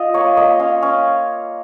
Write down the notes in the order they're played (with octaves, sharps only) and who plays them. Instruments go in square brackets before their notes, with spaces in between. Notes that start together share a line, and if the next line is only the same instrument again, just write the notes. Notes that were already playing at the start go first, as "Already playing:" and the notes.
Already playing: [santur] F4 D#5 F5
A#3 C#5
A#3 D#5
C#4 F5
C#4